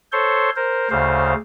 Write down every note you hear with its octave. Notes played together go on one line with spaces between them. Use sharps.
A4 C5 C#5 C6
A#4 C5
D2 C#3 C5 F5